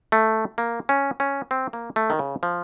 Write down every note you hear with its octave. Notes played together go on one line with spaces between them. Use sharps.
A3
A#3
C#4
C#4
C4
A#3
A3
D#3
C#3
F3